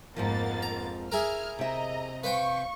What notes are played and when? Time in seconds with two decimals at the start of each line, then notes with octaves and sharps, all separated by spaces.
0.16 F2 G#2 F3 A#3 B3 A6
0.62 A#5
1.12 E4 G#4 A#4 F6
1.59 C3 D#5 E5 A#5
2.24 B4 C5 F5 G5 C#6